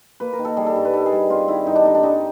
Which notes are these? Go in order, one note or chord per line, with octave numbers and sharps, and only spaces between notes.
A#3 B4
A#4
D#3
A4
G3 G#4
A4
G2
B4
D#3 A4
G#4
G3
C4 F4
D#3 E4
G2 D#4
D4
D3 D#4
D4
G3 D#4